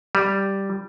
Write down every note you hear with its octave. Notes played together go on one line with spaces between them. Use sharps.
G3